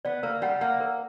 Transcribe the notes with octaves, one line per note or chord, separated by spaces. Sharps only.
B3 D5
A#3 A#4
G3 F#5
A#3 F#5
A#4